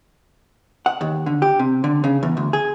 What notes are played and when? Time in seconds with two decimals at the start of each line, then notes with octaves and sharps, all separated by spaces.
0.86 F#5
1.01 D#2
1.26 D3
1.42 G4
1.59 C3
1.84 D3
2.04 C#3
2.23 E2
2.37 D2
2.53 G#4